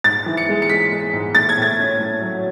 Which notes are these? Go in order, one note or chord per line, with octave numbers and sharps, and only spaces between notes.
G#2 A6
E3
C#7
G#3
C#7
G#3 B6
G#3
G#2
A2 A6
G#6
A2 A6
C#4
A2
F#3